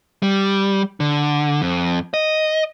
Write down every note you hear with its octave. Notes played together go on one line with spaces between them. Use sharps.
G3
D3
F2
D#5